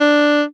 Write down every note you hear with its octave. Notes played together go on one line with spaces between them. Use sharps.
D4